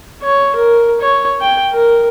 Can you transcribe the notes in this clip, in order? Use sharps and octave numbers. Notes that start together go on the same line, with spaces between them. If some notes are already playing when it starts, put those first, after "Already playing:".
C#5
A#4
C#5
G5
A#4